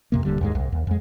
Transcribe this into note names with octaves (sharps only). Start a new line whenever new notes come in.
F2 C3 A#3
D#1 D3 G3
D#2 G#2 G#3
C2
D#2
F2 G#3